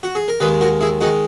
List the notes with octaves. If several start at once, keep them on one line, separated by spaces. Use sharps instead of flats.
F#4
G#4
A#4
D#2 D#3 G#3 G#4 B4
F#4 A#4
E4 G#4
D#3 G#3 D#4 F#4